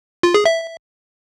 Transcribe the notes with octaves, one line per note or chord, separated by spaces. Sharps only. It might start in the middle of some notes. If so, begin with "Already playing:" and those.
F4
G#4
E5